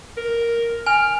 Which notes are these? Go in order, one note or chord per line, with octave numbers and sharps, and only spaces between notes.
A#4
G#5 F6